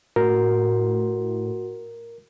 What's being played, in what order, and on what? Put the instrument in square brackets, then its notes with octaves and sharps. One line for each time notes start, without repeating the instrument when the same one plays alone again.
[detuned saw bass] A2 [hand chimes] F#4 [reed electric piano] A#4